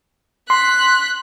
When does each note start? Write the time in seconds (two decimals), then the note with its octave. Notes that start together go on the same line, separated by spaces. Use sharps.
0.50 C6 F#6 B6